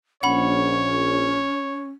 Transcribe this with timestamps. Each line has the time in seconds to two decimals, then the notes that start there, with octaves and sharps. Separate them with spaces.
0.23 A#1 C#4 C#5 F#5 B5